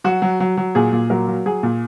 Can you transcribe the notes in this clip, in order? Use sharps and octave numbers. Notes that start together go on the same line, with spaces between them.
F#3 F#4
F#3
F#3
F#3
A#2 G#4
A#2
F#3 A#4
F#3
F#3 G#4
A#2